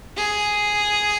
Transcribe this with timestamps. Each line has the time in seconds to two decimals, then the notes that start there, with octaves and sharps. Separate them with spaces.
0.17 G#4